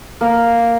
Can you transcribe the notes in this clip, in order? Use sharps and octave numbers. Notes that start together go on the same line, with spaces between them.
A#3